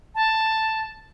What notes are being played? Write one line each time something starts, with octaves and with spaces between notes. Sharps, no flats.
A5